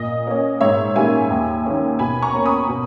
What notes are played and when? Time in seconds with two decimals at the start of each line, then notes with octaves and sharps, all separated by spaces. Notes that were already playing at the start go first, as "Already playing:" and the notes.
Already playing: A#2 D#5
0.27 A#3 C#4
0.61 G#2 C#5 E5
0.95 D#3 G3 A#3 C#4 E5 G#5
1.30 D#2
1.65 D#3 A#3 C#4
1.99 B2 G#5 B5
2.22 A#5 C#6
2.34 A#3 C#4
2.46 B5 D#6
2.68 B2